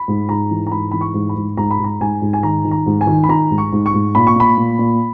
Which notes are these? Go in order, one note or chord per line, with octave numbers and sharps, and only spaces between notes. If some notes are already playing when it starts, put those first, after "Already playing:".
Already playing: B5
G#2
G#2 A#5
E3
A#5
G#2 B5
E3 B5
C#6
G#2
B5
G#2
G#2 A#5
B5
G#2
A#5
G#2 G#5
G#2
G#5
D#3 A#5
D#3
A#5
G#2
G#5
D#3
B5
D#3 A#5
G#2
C#6
G#2
C#6
G#2
A#2 B5
C#6
A#2 B5
A#2
A#2